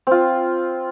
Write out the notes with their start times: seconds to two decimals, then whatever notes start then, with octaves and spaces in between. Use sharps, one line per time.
0.07 C4 F4